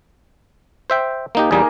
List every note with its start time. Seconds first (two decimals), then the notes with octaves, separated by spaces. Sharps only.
0.90 C5 E5 G5
1.35 A#3 D#4 G4
1.51 E2 G3 A#3 D#4 G#4